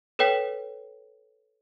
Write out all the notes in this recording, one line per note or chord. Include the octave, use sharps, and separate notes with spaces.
A4 B4 C#5 G5 B6